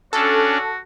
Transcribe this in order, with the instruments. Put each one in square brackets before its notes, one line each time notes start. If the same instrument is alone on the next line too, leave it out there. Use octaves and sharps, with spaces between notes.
[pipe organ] C#4 D4 [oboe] F#4 [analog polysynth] A4